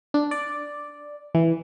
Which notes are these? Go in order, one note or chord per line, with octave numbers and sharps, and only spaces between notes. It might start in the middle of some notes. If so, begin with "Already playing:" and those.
D4
D5
E3